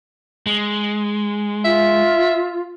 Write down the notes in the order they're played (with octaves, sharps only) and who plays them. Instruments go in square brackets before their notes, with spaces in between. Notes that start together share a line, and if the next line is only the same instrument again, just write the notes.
[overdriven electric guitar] G#3
[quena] F4 [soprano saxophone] E5